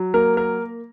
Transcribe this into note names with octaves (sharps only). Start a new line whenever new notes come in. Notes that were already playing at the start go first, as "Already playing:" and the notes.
Already playing: F#3
A#3 A#4
A#4